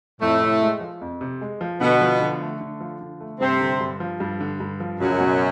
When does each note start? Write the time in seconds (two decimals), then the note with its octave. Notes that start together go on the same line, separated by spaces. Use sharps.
0.21 F2 A2 A3
0.41 C3
0.62 G#3
0.81 F3
1.01 F2
1.21 C3
1.41 G#3
1.61 F3
1.81 B2 D3 B3
2.01 F3
2.21 D3
2.41 A3
2.61 D3
2.81 F3
3.01 D3
3.21 A3
3.40 G2 C3 C4
3.61 D3
3.81 G2
4.00 F3
4.20 G2
4.40 D3
4.60 G2
4.80 F3
5.00 C#2 F#2 F#3
5.20 B2